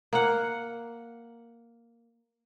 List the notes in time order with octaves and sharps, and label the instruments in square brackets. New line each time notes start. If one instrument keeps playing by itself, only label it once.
[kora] A#3 F#5